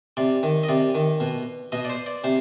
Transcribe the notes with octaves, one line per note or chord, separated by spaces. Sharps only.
C3 D5
D#3
D#5
C3 D5
D#3
B2
B2 D#5
D5
C5
D5
C3 C5